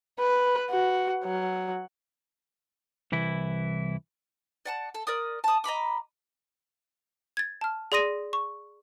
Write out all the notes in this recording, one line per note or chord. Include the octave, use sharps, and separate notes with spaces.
B4
F#4
F#3
C2 E3 E4
D5 F#5 A5
A4
A#4 D5 D#6
A5 D#6
D#5 A#5 B5 D6
G#6 A6
A5 F6
G#4 D5 C6 D#6 A#6 D#7
C#6